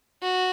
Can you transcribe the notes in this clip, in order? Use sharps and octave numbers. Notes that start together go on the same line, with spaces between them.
F#4